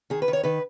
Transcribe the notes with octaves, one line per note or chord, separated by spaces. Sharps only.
D#3 G#4
B4
D#3
C#5
D#3 B4